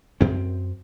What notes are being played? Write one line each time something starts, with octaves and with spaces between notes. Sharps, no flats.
F#2 C4